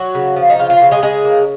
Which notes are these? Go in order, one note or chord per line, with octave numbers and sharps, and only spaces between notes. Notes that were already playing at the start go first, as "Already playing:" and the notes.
Already playing: F#3 F#4
C#3
F3
D#4
C#3 F4
F4
C#3
G#3 G#4
C#3 G#3 G#4
A#3